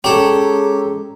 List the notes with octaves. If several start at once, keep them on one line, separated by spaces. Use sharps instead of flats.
G#3 C#4 G4 A4 C#5 A#5